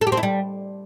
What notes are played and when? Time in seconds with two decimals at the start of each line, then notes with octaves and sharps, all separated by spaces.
0.01 A4
0.07 G4
0.12 C4
0.17 E4
0.23 G3